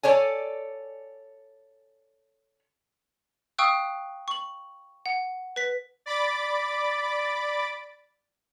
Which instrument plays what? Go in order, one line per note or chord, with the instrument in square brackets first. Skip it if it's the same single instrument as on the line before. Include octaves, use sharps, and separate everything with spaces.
[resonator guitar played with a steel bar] A4 C#5 D5 G#5
[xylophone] F5 G5 C#6 D#6 E6 F#6
C#6 F#7
F#5
B4 B6
[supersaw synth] D5 B5 D6 A6